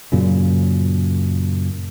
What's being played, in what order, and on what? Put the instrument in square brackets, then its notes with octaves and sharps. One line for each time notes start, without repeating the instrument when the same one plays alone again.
[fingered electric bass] F#2 A#2 C#3